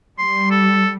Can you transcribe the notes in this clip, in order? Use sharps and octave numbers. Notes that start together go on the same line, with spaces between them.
G3 C6
A4